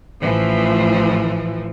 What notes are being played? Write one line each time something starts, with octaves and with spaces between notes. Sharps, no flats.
A1 E3 F3